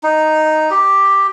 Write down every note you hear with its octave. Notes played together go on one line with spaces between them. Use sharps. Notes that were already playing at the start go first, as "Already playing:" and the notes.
D#4
G4